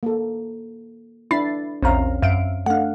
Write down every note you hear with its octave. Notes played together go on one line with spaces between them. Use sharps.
A#3 A4
D4 E4 B5 A6 C7
A#1 E2 C4 C#4 F5 A#5
F#2 E5 F5 D7
A3 D4 F5 F#5